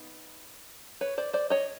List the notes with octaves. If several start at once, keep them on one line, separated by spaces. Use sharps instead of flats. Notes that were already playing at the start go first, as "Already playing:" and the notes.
Already playing: B3 D#4
B4 C#5
C5 D5
C5 D5
C#5 D#5